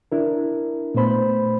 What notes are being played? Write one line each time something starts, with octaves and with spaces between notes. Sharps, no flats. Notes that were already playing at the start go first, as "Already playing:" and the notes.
D4 E4 A#4
A#2 A3 B3 C5 B5